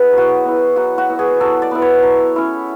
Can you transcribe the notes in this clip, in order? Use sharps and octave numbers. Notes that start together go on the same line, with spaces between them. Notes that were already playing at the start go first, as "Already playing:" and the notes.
Already playing: B3 E4 G#4 B4
F#3
F#4
B3 E4
F#3 F#4
F#4
B3 E4
G#4
F#3 A4
D5
B3 E4
C#5
F#3
C#4 E4